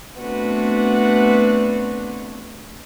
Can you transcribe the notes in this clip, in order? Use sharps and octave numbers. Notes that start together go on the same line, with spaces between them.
A3 B3 C4 D4 F#4 B4